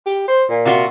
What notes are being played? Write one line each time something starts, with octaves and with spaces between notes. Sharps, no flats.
G4
C5
A#2
C3 F4 F#4